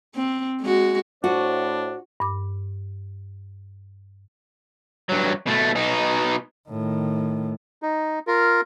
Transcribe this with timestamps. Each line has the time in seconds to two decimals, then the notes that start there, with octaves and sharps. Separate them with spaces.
0.15 C4
0.61 G#3 F#4
1.24 A2 D4 F#4 C5
2.20 G2 D6
5.09 G2 F#3
5.47 B2 A3
5.76 B2 D#4
6.69 A2 D#3
7.82 D#4
8.27 F4 A#4